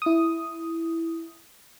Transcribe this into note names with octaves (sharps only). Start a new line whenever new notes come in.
E4 D#6